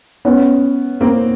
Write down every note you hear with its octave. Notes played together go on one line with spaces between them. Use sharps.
B3 C#4
A#3 C4